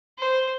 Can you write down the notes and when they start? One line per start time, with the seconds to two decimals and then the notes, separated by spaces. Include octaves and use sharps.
0.18 C5